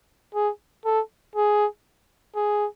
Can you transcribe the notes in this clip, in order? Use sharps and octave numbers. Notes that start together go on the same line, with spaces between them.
G#4
A4
G#4
G#4